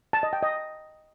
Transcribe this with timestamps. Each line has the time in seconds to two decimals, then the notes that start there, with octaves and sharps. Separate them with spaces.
0.13 A5
0.23 D#5
0.33 G5
0.43 D#5